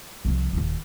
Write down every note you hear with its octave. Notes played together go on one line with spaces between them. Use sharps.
C2 F3
D#1 D#2